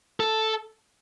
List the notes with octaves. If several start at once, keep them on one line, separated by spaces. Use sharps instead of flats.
A4